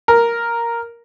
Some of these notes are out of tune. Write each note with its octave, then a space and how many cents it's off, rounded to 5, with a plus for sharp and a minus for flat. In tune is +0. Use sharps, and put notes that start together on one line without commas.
A#4 +0